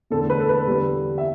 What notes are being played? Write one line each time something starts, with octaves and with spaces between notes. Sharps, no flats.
E2 D3 A3 A4
B4
A4
B4
E2 D3 G3
E5